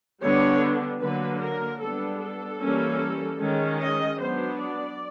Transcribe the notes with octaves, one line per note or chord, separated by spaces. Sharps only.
D3 G3 B3 D4 C#5
D3 F#3 A#3 B4
A#4
G3 B3 D4 A4
A4
E3 G3 A#3 C#4
D#3 G#3 C#4
D#5
F#3 B3 D4 C5
D5